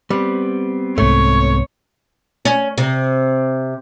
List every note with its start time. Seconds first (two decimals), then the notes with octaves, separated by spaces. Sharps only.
0.10 G3 B3 C4
0.98 C2 G#2 A3 C#5
2.45 C#4
2.78 C3